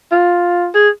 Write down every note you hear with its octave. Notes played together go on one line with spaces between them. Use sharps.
F4
G#4